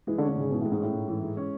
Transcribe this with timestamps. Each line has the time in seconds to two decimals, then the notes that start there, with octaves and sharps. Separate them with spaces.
0.07 E3 G#3
0.18 D3
0.22 C#4
0.29 D3
0.36 G#2 C#3
0.50 B2 E3
0.62 A2 G#3
0.72 G#2
0.80 A2 C#4
0.94 G#2
1.08 E3
1.23 G#3
1.37 C#4